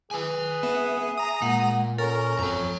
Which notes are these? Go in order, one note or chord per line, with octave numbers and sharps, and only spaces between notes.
G#4 B4 G#5
B3 E5
A#5 D#6
A#2 G#3 F#5
C#4 A4 A#4
F2 C#5 A#5